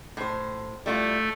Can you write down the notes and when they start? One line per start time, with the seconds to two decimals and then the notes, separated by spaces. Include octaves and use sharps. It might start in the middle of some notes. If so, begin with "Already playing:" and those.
0.17 A2 C5
0.86 G3 A3 E4 F4